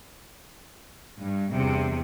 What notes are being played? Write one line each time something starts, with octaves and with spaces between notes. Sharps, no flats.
G2
E2 G2 C3